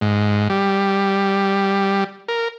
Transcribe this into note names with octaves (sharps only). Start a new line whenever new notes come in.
G#2
G3
A#4